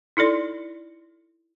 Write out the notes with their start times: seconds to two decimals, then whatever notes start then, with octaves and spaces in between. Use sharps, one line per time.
0.17 D#4 E4 A4 D5 C6